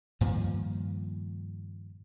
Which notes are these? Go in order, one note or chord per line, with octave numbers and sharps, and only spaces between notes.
G2 A#2 D#3 F3